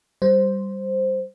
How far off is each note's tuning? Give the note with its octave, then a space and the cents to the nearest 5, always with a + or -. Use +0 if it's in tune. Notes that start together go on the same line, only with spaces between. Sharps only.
G3 +0 C5 +0